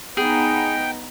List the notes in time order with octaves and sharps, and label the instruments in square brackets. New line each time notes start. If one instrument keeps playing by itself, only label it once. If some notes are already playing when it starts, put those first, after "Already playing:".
[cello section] B3 D#4 [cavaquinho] G#4 [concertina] G5